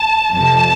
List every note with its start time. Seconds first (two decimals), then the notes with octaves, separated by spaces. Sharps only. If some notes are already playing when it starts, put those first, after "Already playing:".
Already playing: A5
0.34 F2 C3 F3 A5